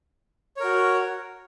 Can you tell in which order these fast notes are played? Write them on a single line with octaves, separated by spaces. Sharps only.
C#5 A#4 F#4